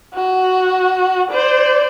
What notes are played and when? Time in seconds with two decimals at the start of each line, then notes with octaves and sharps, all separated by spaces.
0.14 F#4
1.31 C5 D5